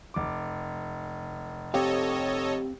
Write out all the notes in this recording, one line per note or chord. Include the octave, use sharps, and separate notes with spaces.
F1 D6
C4 G4 A4 C#5 D#5 F5